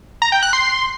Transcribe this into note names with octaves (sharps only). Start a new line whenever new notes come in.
A#5
G5
F#6
C6